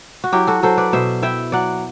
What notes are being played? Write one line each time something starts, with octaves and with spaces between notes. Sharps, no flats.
F#4
F#3 E4 G4
F#4 A4
F#3 A4 C5
B4 D5
B2 C5 E5
E4 E5 G5
F#3 D5 F#5